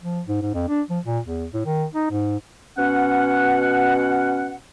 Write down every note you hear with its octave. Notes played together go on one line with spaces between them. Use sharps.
F3
G#2
G#2
F2
D4
F3
A#2
E2
A2
D#3
D#4
G#2
B2 C#4 F#5